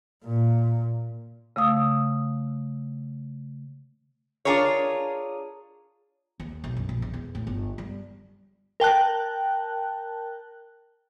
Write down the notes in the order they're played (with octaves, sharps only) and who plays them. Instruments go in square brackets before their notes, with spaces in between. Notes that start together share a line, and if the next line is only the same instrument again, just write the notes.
[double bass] A#2
[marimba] C#3 A3 F5 D#6 E6
[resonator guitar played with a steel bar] D4 F4 G#4 A#4 C#5
[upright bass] D#2
B1
F#2
A#1
E2
E2
A2
G1
G3
[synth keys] A#4 G5 A5 F#6